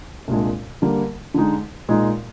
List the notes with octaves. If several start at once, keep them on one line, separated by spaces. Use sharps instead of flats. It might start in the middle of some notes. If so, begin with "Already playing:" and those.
C2 A#2 G#3 D4
D3 G3 A#3
D3 G#3 D#4
A#2 G#3 D#4